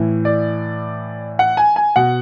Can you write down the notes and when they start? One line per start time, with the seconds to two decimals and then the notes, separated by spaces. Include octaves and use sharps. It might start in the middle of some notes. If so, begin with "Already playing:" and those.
Already playing: A2 E3
0.25 D5
1.39 F#5
1.57 G#5
1.76 G#5
1.96 B2 F#5